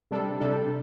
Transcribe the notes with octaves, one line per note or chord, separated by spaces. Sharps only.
C3 G3 D4 A4
C3 G3 D4 A4